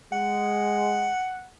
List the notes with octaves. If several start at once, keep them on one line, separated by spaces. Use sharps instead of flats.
G#3 F#5